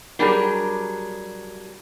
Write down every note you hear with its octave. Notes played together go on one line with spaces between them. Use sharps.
F#3 G3 D4 G4 G#4 A#4